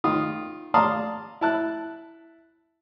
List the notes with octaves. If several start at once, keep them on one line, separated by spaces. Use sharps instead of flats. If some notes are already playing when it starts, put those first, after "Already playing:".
D#3 F4 D#6
D5 F5 A5 A#5 C6 D#6
E4 A5 F#6